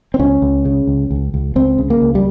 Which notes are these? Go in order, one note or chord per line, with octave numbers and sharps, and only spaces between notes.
C4
C#2 C#4
C#2
C#3
C#2
C#2
C#2
C#2 C4
C#3
A#3
C#2
G3